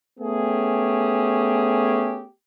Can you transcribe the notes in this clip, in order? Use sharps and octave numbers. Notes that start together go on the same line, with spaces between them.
A3 B3 C#4 G4 G#4